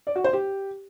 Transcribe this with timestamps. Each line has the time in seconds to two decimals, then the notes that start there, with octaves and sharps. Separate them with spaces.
0.07 D5
0.16 F#4
0.24 C5
0.33 G4